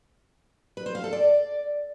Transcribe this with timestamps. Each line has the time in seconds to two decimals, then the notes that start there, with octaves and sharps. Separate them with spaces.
0.77 B4
0.86 C5
0.95 F5
1.04 A4
1.13 D5